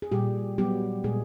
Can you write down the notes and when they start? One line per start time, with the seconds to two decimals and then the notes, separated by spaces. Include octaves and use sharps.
0.02 G#4
0.12 A#2 G3 G4
0.58 F#3 G3 B3 G4
1.04 A#2 G#3 G#4